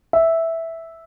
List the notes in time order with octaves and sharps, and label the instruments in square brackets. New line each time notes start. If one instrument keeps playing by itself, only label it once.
[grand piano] E5